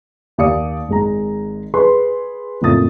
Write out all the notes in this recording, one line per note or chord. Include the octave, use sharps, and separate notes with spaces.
D#2 G4 D5 F5 D#6 C#7
G#1 G#3 A#5
G#4 B4 C6
F#1 F2 A2 F4 D#6 A6